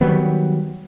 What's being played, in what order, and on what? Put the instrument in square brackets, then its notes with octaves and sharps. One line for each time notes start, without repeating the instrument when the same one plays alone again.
[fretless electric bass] D#3 F#3 G3 B3